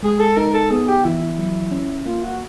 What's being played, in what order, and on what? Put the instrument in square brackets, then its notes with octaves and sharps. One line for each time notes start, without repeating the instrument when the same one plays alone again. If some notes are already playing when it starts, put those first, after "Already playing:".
[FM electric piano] G#3 [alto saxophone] G#4
[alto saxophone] A4
[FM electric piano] D#4 [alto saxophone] A#4
[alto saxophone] A4
[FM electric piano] B3 [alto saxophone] G#4
[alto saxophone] G4
[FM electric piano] E3 [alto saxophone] E4
[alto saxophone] E4
[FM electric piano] F#3
C#4
[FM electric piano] A#3 [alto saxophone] F4
[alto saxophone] F#4